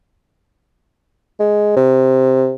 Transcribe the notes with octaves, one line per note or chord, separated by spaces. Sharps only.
G#3
C3